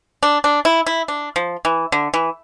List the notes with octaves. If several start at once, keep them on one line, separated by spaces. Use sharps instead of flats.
D4
D4
E4
E4
D4
F3
E3
D3
E3